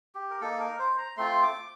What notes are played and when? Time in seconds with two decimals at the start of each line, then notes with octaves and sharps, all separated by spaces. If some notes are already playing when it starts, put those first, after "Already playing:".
0.15 G4
0.31 A#4
0.41 A#3 D#4 A4
0.60 A#4
0.79 C5
0.98 A#5
1.17 A3 C4 F4 C6
1.43 D6